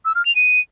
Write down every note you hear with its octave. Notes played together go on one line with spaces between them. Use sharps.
E6
F6
F7
D#7